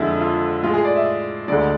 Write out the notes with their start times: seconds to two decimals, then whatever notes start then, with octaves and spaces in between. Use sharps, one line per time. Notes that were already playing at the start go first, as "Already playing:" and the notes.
Already playing: F2 D3 G#3 E4
0.21 F4
0.63 A2 G#3 F4
0.74 G#4
0.85 D5
0.95 E5
1.48 D2 D3 G#3 D5